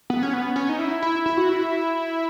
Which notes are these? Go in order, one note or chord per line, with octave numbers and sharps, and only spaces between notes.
B3
C#4
B3
C#4
D#4
E4
E4
E4
F#4
E4